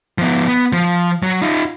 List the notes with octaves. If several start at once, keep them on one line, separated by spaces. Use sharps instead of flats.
F3 B3
B3
F3
F#3
D#4 F4